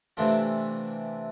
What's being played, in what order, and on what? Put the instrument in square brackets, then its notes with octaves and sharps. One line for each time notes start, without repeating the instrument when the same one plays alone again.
[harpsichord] C3 E3 A3 D4 F4